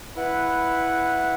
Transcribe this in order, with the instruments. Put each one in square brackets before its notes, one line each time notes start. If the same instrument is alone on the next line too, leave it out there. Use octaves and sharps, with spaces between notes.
[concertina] E4 B4 F#5